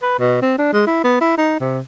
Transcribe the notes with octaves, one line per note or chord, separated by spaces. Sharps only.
B4
B2
C4
D4
G#3
E4
B3
E4
D#4
C3